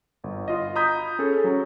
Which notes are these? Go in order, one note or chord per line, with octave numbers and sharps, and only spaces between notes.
G1
F4 D#5
A#5 B5 D#6 G6 G#6 B6
C#4 G#4 A4
F#3 C#4 A#5